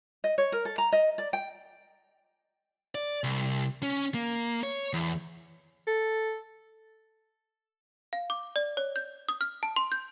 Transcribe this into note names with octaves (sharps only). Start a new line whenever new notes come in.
D#5
C#5
A#4
A4
A#5
D#5
D5
G5
D5
C2
C#4
A#3
C#5
E2
A4
F5
D6
D5
C#5
G6
D#6
F6
A5
C6
G6